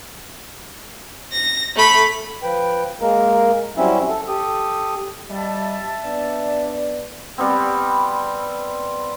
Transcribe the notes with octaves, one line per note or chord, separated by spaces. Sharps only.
A#6
A3 B5
F3 B4 G5
G#3 A#3 A#4
F#3 G3 C4 C#4 E4 E5
A4
G4 A4 D#6
G3 D#5 E5 A5
B3 D4 D5
G3 B3 C4